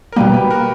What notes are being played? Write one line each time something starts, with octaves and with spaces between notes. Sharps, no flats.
A#4
B2 G3 A#3 G4 B4
G4 B4
F#4 A#4